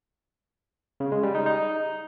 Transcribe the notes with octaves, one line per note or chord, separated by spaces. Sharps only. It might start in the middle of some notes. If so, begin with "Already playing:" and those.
C#3
G#3
G3
D#4
D#4